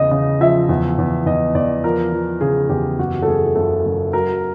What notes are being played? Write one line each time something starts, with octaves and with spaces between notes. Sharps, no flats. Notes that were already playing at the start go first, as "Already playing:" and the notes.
Already playing: E2 C#3 D#5
C#3 D#5
F3 E5
E2
E2
E2 D#5
E2 D5
F3 A#4
F3
C#3 G#4
E2 G4
F#1 F#4
A4
F#1 G#4
F#1 A4
F#1
F#3 A#4